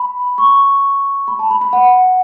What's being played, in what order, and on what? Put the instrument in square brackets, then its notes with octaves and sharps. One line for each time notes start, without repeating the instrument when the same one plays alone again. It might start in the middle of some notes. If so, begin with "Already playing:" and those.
Already playing: [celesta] B5
C#6
B5
A5
B5
B5
F#5